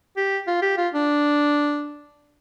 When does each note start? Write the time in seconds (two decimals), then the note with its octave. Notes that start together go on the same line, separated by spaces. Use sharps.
0.17 G4
0.47 F4
0.62 G4
0.77 F4
0.94 D4